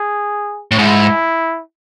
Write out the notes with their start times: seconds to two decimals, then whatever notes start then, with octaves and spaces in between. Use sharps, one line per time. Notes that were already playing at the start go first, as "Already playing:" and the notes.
Already playing: G#4
0.71 A2
0.78 G#2 E4